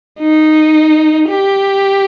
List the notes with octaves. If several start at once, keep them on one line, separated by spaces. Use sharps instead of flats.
D#4
G4